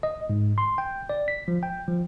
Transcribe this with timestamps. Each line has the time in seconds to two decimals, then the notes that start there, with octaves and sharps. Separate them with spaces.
0.03 D#5
0.30 G#2
0.58 C6
0.78 G5
1.09 D5
1.28 B6
1.48 F3
1.63 G5
1.88 F3